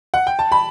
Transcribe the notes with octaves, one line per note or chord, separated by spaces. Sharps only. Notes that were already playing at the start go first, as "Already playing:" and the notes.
F#5
G5
A5
B5